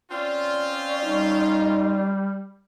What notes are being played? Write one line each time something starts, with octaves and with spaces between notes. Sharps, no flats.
C4 C#4 F4 D5
G3 D#4